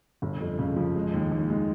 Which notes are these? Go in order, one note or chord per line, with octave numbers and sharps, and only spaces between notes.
G1
F2
C#3
F3
G#3
D#2
D#2
G#3